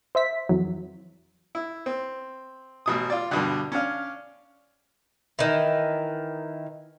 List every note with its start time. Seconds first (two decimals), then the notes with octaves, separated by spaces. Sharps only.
0.15 C5 E5 B6
0.49 F2 E3 F#3
1.55 E4
1.86 C4
2.86 A1 B2 D#6
3.10 F4 D5
3.31 G2 B2 D3
3.72 C#4 D4 F5
5.39 D#3 E3